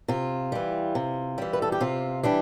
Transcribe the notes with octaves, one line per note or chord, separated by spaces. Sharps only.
C3 F4
E3 G3
C3
E3 G3
B4
A4
G4
C3 F4
E3 G3 D4